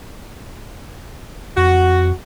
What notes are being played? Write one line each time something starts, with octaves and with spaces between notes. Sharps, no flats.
F2 F#4